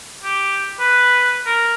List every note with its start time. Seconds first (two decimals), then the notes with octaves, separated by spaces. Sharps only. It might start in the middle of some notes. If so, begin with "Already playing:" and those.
0.24 G4
0.79 B4
1.46 A#4